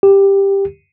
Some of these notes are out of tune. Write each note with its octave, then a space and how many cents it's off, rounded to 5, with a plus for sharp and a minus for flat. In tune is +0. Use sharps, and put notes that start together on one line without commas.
G4 +10